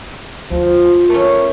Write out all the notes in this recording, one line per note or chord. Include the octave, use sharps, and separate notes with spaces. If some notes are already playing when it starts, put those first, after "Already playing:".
D2 F3 F4
A3 C#4 A#4